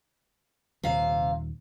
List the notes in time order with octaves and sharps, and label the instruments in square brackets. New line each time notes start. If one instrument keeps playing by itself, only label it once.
[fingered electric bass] D#1 [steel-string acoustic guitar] C3 F5